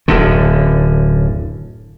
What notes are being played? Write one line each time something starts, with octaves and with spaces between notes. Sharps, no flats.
D1 F#2 D3